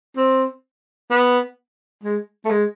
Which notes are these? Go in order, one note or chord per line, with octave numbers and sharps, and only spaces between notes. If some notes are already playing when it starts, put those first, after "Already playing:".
C4
B3
G#3
A3
G#3